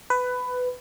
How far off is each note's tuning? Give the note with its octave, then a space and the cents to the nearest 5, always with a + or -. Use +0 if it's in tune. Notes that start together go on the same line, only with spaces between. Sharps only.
B4 +15